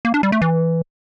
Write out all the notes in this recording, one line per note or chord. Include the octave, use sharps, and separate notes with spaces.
A#3
D4
G3
A3
E3